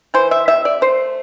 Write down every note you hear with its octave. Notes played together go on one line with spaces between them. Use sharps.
E3 C5
E5
C3 E5
D5
A3 C5